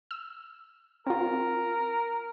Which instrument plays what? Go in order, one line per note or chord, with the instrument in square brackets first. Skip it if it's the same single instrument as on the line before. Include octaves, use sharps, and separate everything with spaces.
[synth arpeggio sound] E6
[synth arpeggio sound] C4 F4 [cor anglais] A#4